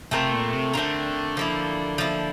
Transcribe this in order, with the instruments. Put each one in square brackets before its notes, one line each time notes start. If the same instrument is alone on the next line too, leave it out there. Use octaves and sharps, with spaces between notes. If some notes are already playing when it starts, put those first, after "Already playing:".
[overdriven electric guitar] C3 [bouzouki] A3 C4 F4 A#4
[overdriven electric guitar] A#2
C3
[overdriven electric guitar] D3 [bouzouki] A3 C4 F4 A#4
[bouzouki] F3 A#3 E4
F3 A#3 E4